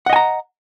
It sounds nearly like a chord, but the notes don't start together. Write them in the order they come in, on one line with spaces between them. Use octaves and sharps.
F#5 D#5 G#5 A#5